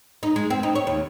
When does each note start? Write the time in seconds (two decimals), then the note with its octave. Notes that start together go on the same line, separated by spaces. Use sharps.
0.23 D#4
0.36 G#3
0.50 C4
0.63 D#4
0.75 C#5
0.87 D#2